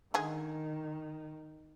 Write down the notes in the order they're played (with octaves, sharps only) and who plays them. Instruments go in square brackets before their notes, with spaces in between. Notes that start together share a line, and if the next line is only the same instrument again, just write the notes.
[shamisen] D3 G#3 G#4 [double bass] D#3